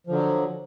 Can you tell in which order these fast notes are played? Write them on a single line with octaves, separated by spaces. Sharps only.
F3 D3 F#3